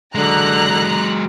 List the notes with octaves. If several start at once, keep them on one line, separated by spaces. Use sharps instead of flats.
D3 F#3 G#3 A#5 F#6